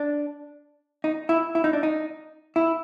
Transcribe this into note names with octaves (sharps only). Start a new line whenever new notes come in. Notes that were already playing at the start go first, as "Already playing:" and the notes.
Already playing: D4
D#4
E4
E4
D#4
D4
D#4
E4